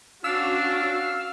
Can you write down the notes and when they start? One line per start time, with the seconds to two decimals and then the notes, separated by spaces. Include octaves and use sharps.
0.24 C#4 D4 F#4 F5 E6 F6